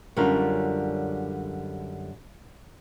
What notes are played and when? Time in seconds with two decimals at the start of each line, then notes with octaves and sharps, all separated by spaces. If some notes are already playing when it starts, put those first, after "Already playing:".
0.16 F#2 D3 G3 C#4 F4 A#4